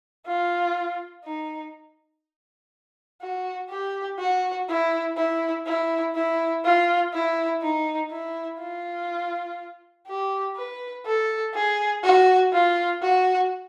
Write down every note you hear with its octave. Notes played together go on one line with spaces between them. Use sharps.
F4
D#4
F#4
G4
F#4
E4
E4
E4
E4
F4
E4
D#4
E4
F4
G4
B4
A4
G#4
F#4
F4
F#4